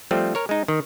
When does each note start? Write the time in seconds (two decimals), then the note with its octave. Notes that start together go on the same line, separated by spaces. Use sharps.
0.11 F3 G3 A3 C4
0.35 A#4 C#5
0.49 G#3 D#4
0.68 D#3